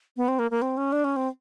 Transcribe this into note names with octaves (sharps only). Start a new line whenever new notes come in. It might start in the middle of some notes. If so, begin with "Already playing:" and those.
B3
C4
A#3
A#3
C4
C#4
D4
C#4
C4